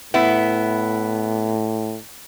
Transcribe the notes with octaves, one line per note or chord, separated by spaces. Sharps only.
A2 B3 E4